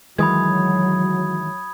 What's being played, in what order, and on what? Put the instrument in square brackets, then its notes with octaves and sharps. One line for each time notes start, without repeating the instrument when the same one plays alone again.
[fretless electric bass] D#3 E3 G#3 [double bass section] F#3 [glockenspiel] B5 D#6 G#6